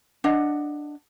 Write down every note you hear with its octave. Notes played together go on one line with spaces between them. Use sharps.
D4 D#5 F#5